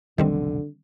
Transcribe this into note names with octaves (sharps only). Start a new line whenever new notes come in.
F1 B1 B2 D3 D#3 G3 C4